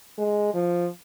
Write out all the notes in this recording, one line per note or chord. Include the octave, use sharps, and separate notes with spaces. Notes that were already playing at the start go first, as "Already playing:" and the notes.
G#3
F3